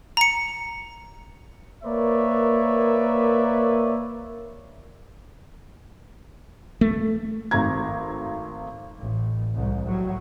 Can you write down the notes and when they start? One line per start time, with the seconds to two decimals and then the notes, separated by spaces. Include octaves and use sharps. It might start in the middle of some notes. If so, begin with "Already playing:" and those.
0.17 A#5 C#7
1.84 A#3 A#4 B4 C#5 D5 E5
6.81 A3
7.51 G#1 A3 C4 A#5 G#6
8.99 A1
9.54 C2 G#2
9.85 A2 F#3